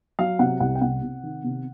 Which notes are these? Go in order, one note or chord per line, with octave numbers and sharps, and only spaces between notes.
F#3 F5
C3 F#5
C2 F#5
G5
C3 F#5
C3
D#3
C3